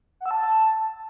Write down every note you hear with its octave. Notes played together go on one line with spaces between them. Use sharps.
F#5
E6
A5